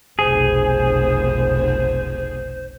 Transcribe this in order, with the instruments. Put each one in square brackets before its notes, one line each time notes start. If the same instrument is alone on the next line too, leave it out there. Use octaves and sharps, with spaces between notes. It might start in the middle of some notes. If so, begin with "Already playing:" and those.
[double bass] F1 B1 [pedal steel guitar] G#4 [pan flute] C5